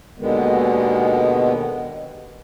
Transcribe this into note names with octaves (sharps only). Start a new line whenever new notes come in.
D#2 B2 D3 D#3 G#3 B3